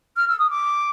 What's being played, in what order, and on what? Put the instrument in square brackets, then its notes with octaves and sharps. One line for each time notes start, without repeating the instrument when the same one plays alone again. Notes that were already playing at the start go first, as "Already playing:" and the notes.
[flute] F6
E6
D#6
D6